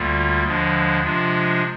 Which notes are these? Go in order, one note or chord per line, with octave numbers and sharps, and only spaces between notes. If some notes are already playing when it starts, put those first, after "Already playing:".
Already playing: D2 D3 G3 A#3 F4
D#2 D3 F3 G#3 D4
C3 F3 G#3 D4 F4